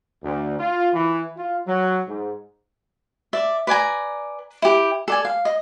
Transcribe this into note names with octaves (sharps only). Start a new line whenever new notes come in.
D2
F4
E3
F4
F#3
G#2
D5 E5
B4 D5 G#5 A#5
E4 G4
A4 D5 G#5
F5
D#5